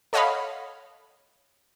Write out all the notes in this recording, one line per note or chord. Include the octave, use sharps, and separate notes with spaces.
A4 C#5 D#5 F5 F#5 B5